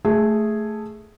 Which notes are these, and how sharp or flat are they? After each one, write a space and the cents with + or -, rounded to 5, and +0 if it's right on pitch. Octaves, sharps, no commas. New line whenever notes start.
A3 +0 G#4 +0